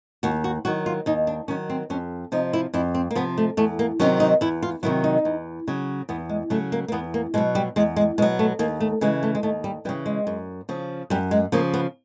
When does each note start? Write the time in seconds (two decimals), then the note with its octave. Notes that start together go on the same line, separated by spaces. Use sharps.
0.23 D#2 F#4
0.44 F#4
0.65 D#3 F#3 F#4
0.86 F4
1.06 D#2 D#4
1.27 D4
1.48 D#3 F#3 C#4
1.70 C4
1.90 F2 C#4
2.32 C3 F3 D#4
2.53 E4
2.74 F2 E4
2.94 C4
3.11 A#3
3.15 C3 F3 B3
3.37 A3
3.57 E2 A3
3.79 A#3
4.00 C3 D#3 F#3 C#4
4.20 D#4
4.41 E2 E4
4.63 F4
4.83 C3 D#3 F#3 E4
5.04 D#4
5.25 E2
5.68 C#3 F#3
6.09 E2 B3
6.29 G#3
6.50 C#3 F#3 A3
6.72 A#3
6.88 A#3
6.92 E2 B3
7.14 A#3
7.34 B2 F#3 G#3
7.55 G3
7.76 E2 G#3
7.96 G#3
8.18 B2 F#3 G#3
8.39 A3
8.59 D#2 A#3
8.80 A3
9.01 C#3 E3 G#3
9.23 A3
9.35 G#3
9.43 D#2 A3
9.64 G3
9.85 E3 G3
9.89 C#3
10.06 G#3
10.27 F#2
10.69 C#3 F3
11.10 F#2 G3
11.31 G#3
11.52 C#3 F3 A#3
11.74 B3